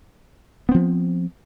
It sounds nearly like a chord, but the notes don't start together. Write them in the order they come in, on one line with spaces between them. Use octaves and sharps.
B3 C4 F3